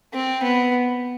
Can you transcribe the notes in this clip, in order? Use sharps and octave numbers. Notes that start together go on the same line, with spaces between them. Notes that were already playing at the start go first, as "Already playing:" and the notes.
C4
B3